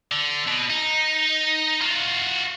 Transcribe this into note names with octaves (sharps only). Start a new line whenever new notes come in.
D3
B2
D#4
F4 F#4